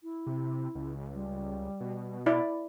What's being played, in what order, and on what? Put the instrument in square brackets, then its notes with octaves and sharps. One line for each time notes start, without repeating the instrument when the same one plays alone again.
[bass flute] E4
[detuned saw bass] C3
C#2
[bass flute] G3
[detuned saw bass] B2
[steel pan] E4 D5